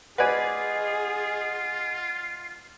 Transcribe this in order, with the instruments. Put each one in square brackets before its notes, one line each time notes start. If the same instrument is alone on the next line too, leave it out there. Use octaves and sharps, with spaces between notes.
[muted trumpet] F4 [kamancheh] G#4 [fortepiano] B4 D5 G#5 [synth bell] D#5 F#5